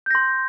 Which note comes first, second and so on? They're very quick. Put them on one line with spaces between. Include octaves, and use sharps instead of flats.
G6 A#6 C6